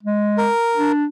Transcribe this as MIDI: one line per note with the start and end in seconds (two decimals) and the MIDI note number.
0.03 0.49 56
0.38 0.92 70
0.77 1.06 62